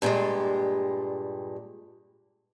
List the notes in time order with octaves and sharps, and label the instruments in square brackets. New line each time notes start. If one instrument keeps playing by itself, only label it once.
[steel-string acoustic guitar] G2 A#2 D#3 G3 G#3